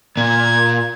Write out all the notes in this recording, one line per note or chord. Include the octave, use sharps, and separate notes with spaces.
A#2 G#6